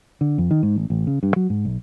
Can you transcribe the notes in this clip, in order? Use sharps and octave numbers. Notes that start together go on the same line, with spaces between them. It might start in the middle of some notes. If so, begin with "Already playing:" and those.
D3
F2
D#3
G#2
A1
A1
C#3
G2
F#3
G#2
B1